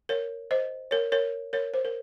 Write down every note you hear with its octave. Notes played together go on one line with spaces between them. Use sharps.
A#4 C#5
C5 D#5
A#4 C#5
A#4 C#5
A#4 C#5
C5
A#4